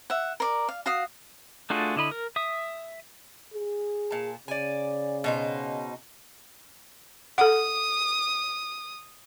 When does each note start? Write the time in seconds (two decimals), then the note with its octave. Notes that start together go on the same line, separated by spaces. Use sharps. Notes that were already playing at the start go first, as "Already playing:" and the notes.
0.10 E5 F#5
0.40 A#4 D5
0.68 F5
0.86 F#4 F5 D#6
1.70 A3 D4 F4 F#4 G#4
1.96 D3 E4 D#5 B5
2.11 A#4
2.36 E5 D#6
3.54 G#4
4.11 A#2 A5
4.48 C#3 D5 G#5
5.24 B2 D#4 C5
7.38 A4 F#5 D#6